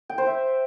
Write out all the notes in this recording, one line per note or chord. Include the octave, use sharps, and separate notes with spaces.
G5
C5
E5